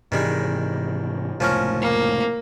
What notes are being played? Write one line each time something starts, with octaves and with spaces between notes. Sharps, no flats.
G#2 C3 D#3 E3 G3 G#3
F1 C#2 A2 F3 C#4 A#4
A#3